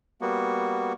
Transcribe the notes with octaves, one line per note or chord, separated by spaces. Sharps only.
G3 A#3 B3 F#4